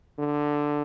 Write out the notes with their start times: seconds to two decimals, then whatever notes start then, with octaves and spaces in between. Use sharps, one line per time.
0.19 D3